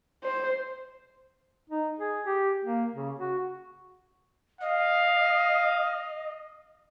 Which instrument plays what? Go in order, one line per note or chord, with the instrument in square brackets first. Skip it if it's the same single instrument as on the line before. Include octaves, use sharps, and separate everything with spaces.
[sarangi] C5
[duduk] D#4
G#4
G4
A#3
C#3
F#4
[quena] D#5 [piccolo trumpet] F5